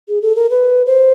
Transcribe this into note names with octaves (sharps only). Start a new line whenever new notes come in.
G#4
A4
A#4
B4
C5